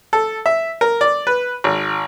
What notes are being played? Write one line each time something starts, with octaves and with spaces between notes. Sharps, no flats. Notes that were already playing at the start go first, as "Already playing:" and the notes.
A4
E5
A#4
D5
B4
G#1